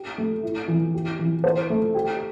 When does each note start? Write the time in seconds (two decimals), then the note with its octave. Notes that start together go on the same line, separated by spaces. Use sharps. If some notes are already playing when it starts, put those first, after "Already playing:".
Already playing: G4
0.18 A3
0.43 E4
0.68 E3
0.94 G4
1.19 E3
1.44 C5
1.70 A3
1.94 G4